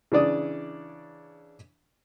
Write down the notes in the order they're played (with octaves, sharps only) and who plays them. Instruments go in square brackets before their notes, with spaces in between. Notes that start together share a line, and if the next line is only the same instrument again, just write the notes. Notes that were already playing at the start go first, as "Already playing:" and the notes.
[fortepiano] C#3 E3 D4 D5 D#6